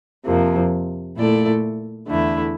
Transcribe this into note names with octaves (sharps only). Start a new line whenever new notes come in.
F2 C3 F3 A#3
A#2 A3 E4 A4 D5
E2 D3 A3 E4